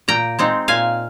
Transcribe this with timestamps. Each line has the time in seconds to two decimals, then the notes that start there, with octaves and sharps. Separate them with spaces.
0.08 A#2 G5 A#5
0.39 G#3 C4 D#4
0.68 A#2 F5 G#5